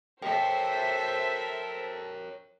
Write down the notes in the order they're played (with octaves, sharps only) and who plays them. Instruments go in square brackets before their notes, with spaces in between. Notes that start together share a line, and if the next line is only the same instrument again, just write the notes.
[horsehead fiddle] A4 [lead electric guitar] A#4 C#5 [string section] C5 E5 [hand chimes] G5